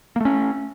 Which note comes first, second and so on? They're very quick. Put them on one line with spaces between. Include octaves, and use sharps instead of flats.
A#3 A3 C#4